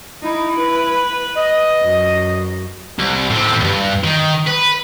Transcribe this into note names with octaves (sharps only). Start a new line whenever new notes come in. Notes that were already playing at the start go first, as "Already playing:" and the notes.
D#4 E4
B4
D#5
F#2
C2
A2 C4
D2 G2
D#3
B4